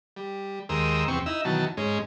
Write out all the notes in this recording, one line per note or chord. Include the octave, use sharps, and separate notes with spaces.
G3
D#2 G#3 A#4 C5 D#6 E6
E2 C3 C4 C#6
D#4 E4 E6
B2 D#3 E3 F#3 A5
G#2 G#3 C#4